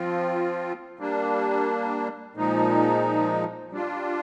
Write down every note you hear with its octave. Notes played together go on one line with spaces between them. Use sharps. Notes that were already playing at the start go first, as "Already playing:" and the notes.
Already playing: F3 C4 F4
G3 A#3 D4
A#2 F3 G#3 D#4
G3 D4 F4